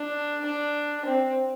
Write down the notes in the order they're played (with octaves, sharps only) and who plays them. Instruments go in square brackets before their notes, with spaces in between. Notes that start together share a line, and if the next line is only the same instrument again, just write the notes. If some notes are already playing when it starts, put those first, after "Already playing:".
Already playing: [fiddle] D4
D4
C4